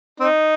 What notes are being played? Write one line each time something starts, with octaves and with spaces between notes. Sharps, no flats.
C4 D#4